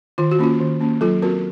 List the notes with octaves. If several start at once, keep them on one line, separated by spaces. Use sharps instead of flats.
D#3 F4
F#4
A#3 C#4 F4
D#3
A#3 C#4
F#3 F4 A4
C4 F#4 A#4